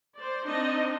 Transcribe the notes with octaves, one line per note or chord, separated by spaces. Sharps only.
C5 D5
C4 D4 D#4 D#5